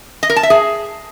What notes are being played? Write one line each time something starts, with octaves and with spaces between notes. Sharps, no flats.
D#5
A#4
A5
E5
G#4